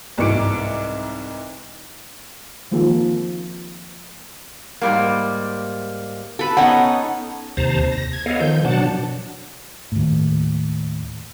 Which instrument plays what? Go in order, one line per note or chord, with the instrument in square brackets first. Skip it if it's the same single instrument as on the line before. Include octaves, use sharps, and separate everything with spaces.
[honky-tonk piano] C2 G#2 E3 D6 C#7 D7
[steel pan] D#3 F3 G#3 A#3
[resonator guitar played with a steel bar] G#2 G3 A#3
[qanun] A4 B4
[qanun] B3 C#4 D#4 [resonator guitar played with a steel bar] F#5
[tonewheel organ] D#2 C3 C5 A5 A#5
A#6
G#6
B3 A4 C#5 D#5 F5
D#3 F3 G6
B2 F#3 D4 F#5 A5
[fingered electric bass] D#2 A2